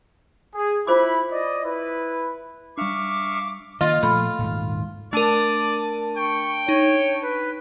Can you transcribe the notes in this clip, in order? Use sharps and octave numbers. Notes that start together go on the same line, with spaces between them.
G#4
E4 F4 C5 B5 D6
D5 D#5
E4 B4
G3 D4 E5 F5 C#6 D6
D#3 A#3 F4 D#5
A#2 F3 A3 B5
D#1 G#2
A3 D4 A#4 D5 A5 D#7
G5 C#6
D#4 C#5
B4